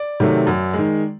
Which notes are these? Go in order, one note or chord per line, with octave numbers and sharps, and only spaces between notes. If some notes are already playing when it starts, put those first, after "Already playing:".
Already playing: D5
C3 D#3 F#3 A3
F#2
D#3 G#3